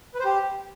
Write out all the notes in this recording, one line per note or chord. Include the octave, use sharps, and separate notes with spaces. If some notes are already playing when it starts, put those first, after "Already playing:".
B4
C5
G4